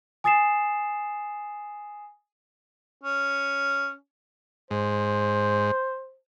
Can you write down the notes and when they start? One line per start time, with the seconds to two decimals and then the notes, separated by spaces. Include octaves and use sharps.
0.24 G#5 D#6 A6 C7 E7
3.02 C#4
4.71 G#2 C5